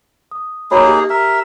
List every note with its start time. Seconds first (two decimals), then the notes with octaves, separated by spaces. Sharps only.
0.31 D#6
0.71 A#3 D#4 F#4 G#4 C#5 B5
0.86 G4
1.10 A#4 E5